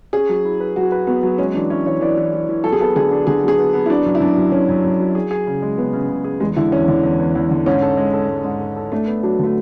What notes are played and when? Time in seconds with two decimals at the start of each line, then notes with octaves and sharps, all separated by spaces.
0.13 C#4 G#4
0.29 F#3
0.45 E4
0.60 B4
0.76 F#3 F#4
0.92 B4
1.07 F#3 B3
1.23 F#3
1.38 G#3 C#4
1.54 E3 D4
1.70 C#4 E4
1.86 E3 C#5
2.01 E3 D5
2.17 E3
2.33 E3
2.49 E3
2.64 F#3 A4
2.72 G#4
2.80 B3 A4
2.96 D3 G#4
3.11 D4
3.27 D3 G#4
3.43 F#3 G#4
3.59 B3
3.73 B3
3.86 E4
3.89 F#3 D4
4.06 F#2
4.15 E4
4.20 F#2 D4
4.37 F#2
4.52 F#2 C#4
4.69 F#2
4.84 F#2
5.00 F#3
5.15 G#4
5.31 G#4
5.47 C#3
5.62 G#3
5.78 C#3 B3
5.93 C#3
6.09 C#3
6.24 G#4
6.40 E2 G#3
6.56 D3 E4
6.72 E2 C#4
6.88 D3
7.03 E2
7.19 E2
7.35 E2
7.51 D3
7.66 G#2 C#4
7.82 A4
7.97 G#3
8.13 A4
8.29 G#3
8.44 G#2
8.60 A4
8.76 A4
8.92 A3 D4
9.07 B3
9.23 F#3 D4
9.39 D3 A3